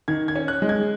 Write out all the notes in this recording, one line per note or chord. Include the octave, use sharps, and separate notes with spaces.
D#3 G#6
G#6
C#4
F#6
G#3
G#6